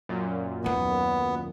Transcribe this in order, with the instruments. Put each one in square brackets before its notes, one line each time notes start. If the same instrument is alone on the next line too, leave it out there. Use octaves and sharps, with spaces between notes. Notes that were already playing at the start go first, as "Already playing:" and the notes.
[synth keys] F#2 A#2
[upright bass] D#2 D#3 [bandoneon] B3